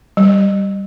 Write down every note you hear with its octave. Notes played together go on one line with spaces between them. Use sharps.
G3